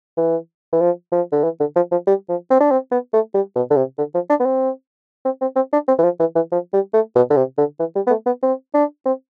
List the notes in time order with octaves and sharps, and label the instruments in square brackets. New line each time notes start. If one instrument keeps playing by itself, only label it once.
[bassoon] E3
E3
F3
F3
D3
E3
D3
F3
F3
G3
F3
C4
D4
C4
B3
A3
G3
B2
D3
C3
D3
F3
D4
B3
C4
C4
C4
C4
D4
C4
E3
F3
E3
E3
F3
G3
A3
B2
D3
C3
D3
E3
G3
B3
A3
B3
C4
D4
C4